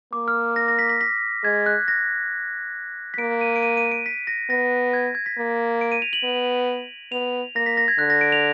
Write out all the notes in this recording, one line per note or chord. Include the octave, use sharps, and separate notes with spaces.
A#3 D6
F6
A#6
A#6
B6
B6
B6
G#3 G#6
F#6
A#6
B6
A#3 D7
D#7
D7
D#7
D#7
D7
B6
A#6
B3 A#6
G#6
G#6
B6
A#3
D7
D#7
F7
F#7
B3
B3 F7
A#3 A#6
B6
A#6
G#6
D3 F#6
A#6
D7
F7